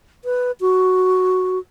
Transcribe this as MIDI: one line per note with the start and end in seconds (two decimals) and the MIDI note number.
0.25 0.52 71
0.61 1.59 66